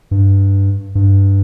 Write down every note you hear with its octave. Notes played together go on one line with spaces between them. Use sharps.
G2
G2